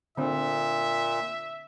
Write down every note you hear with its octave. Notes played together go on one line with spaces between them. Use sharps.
A#2 D3 C4 E5